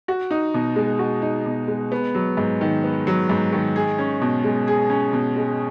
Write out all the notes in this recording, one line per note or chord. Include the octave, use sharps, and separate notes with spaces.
F#4
D#4
B2
G#3
F#4
D#4
B2
G#3
B3
F#3
G#2
D#3
B3
F#3
G#2
D#3
G#4
C#4
B2
G#3
G#4
C#4
B2
G#3